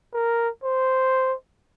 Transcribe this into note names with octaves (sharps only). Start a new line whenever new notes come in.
A#4
C5